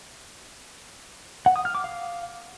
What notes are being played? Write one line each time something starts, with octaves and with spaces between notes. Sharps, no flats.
F#5
D#6
F6
D6
F5